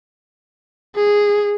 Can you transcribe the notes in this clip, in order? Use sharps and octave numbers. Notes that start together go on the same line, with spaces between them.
G#4